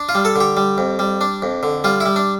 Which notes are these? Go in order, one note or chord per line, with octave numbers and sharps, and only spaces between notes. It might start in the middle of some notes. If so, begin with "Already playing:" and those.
Already playing: D4
F4
G3
A4
D3 G4
G3
F2
G3
D4
F2
D3
G3 F4
E4
G3
D4